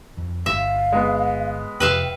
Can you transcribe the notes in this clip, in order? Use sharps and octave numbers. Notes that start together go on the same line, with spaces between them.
F2
G1 E5 F5
G#3 B3
F2 C3 B4 E5 F5 G5